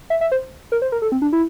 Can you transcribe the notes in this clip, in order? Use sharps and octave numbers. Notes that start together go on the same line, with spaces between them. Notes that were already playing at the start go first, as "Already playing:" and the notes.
E5
E5
C5
A#4
C5
A#4
A4
C4
D4
E4